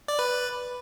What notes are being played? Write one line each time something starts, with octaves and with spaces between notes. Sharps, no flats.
D5
B4